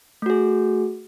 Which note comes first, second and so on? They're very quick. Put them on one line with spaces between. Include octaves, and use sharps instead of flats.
A3 F#4 G#4